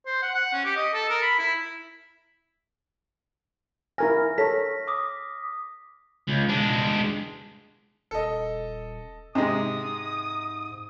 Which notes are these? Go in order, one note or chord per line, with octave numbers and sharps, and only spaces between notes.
C5
F#5
F#5
C#4
G4
D#5
A4
A#4
B5
E4
E4 A#4 G#5 F6 A#6
A4 A#4 C#5 B6
D6 D#6 B6
C#2
G#3 D4
D#1 A4 D#5
G#2 C3 G#3 D#4 D#6